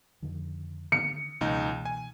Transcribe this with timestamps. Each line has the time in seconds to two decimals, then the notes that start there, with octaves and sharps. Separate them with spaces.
0.23 F2 D3 D#3
0.92 D3 D#3 C#7
1.41 C#2 B2 E3 A#3 D#4
1.85 G#5